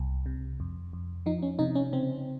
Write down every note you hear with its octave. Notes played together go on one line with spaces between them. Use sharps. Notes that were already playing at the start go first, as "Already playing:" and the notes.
Already playing: C2
C3
F2
F2
F3 D#4
C#4
C3 D#4
C#4
C#3 C4